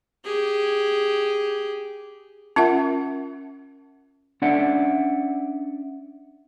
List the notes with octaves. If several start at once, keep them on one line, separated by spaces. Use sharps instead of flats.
G4 G#4
C#4 F4 A#4 E5 F#5
C#4 D4 C#5 D5 E5 F#5